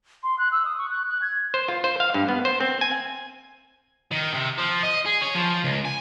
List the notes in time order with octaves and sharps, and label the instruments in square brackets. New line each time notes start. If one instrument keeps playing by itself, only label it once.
[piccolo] C6
F#6
E6
D#6
C#6
F#6
F#6
G#6
[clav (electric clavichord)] C5
F4
C5
F5
G2
B3
C5
C4
G#5
[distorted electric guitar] D#3
C3
F3
D#5
G#4
C#4
F3
C#2
G#5